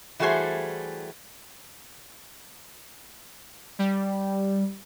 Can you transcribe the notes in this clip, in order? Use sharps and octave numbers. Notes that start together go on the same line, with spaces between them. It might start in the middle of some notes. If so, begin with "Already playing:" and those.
E3 G3 A3 F#4 G#4 C5
G3